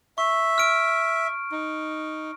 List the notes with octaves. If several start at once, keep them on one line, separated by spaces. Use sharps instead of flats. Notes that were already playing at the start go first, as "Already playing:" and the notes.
E5 C#6
F6 D7
D#4